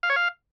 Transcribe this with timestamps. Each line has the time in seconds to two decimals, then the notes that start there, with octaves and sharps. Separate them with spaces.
0.03 F5
0.10 C#5
0.16 F5